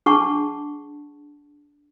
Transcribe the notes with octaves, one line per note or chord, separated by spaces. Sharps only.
D4 G#4 F#5 A5 C#6